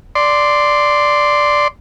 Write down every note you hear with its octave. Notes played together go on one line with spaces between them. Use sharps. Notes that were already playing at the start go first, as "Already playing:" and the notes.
D5 C6